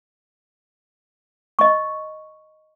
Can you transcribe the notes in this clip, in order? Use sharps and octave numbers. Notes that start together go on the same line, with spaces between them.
D#5 C#6